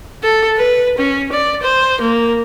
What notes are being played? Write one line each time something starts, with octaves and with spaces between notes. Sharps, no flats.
A4
B4
C#4
D5
C5
A#3